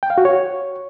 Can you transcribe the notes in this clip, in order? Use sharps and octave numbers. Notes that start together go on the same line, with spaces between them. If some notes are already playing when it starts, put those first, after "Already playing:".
G5
F5
F#4
C#5